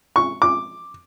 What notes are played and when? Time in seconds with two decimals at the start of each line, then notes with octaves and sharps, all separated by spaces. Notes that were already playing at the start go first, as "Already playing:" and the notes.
0.16 C#6
0.42 D6